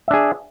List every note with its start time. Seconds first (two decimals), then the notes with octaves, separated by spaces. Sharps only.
0.08 E5
0.11 D4
0.13 G#4